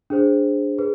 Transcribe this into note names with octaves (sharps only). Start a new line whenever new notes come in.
D4 G#4 C5
G#4 B4